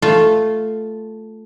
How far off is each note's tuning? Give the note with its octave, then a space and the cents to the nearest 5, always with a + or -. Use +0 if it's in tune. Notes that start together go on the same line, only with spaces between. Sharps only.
A3 +0 F4 +0